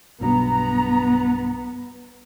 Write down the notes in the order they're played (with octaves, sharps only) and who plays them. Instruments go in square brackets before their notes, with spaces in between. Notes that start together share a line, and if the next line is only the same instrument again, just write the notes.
[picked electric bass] B1 G2 B2 [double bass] B3 [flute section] A#5